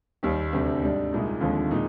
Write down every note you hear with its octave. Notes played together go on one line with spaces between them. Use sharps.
D#2 D#3 G3
D2 C3 G3 D4
G#2 G3 D4
C2 A#2 G#3 D#4
D#2 D3 F3 G#3 C4
A#2 G#3 D#4